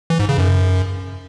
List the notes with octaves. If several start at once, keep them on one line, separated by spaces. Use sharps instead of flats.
E3
G#2
C#3
F#2